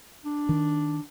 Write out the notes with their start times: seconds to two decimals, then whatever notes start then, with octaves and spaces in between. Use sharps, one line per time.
0.24 D4
0.49 D#3